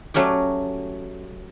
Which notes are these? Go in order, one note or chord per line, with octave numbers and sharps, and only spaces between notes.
F#3 A3 C#4 F#4 G4